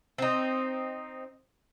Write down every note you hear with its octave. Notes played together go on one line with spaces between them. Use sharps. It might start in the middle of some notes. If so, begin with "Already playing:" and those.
C4 D#4